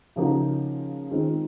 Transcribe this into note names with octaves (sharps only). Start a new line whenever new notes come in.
C#3 F3 A#3 D#4 F#4
D#3 G#3 C4 F4